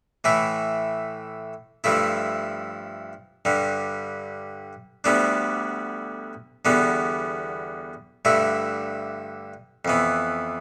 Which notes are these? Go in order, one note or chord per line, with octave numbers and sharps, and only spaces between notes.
A2 E3 A3 E4
G2 F3 A3 E4
G2 D3 G3
D2 D3 G3 B3 D4
E2 D3 G3 B3
G2 D3 A3 E4
F2 E3 B3